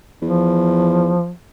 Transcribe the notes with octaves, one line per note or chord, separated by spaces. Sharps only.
E2 F3